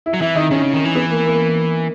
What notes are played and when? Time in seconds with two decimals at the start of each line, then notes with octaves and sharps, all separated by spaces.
0.06 E4
0.13 F#3
0.20 E3 E4
0.35 D#3 D#4
0.50 D#3 C#4
0.62 C#3
0.73 D#3
0.85 E3
0.95 B3
1.11 A#3
1.26 A#3